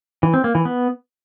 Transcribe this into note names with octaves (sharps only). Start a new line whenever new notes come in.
E3
C4
A#3
E3
B3